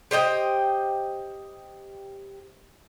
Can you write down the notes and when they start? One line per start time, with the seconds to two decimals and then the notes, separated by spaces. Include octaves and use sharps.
0.11 G4 C5 D#5 G5